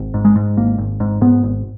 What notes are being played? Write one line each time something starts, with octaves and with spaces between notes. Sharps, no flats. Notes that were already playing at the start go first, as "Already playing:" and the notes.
Already playing: G#1
G#2
G#3
G#2
G#1 A#3
G#1
G#2
G#2 B3
G#1